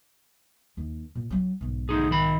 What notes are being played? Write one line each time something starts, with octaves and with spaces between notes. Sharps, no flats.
D#2
A#2
F#3 C#4
B1 G#2
D2 D#4 G#4
D#3 B5